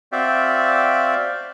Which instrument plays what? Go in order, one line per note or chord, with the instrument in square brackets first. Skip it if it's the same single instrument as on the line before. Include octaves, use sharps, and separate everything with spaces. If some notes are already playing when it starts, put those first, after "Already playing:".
[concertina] C4 F#4 D5 E5 F5 G5